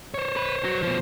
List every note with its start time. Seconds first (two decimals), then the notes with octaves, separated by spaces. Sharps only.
0.14 C5 C#5
0.37 B4
0.64 F#3
0.83 B2 F3